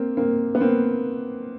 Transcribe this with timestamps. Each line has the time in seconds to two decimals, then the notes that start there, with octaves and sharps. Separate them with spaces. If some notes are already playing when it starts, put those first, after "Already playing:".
Already playing: A#3 C4
0.17 A#3 C4
0.55 B3
0.61 A#3 C4